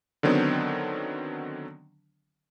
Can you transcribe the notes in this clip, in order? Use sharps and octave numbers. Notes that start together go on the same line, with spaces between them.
D3 D#3 F#3 B3 C4 D4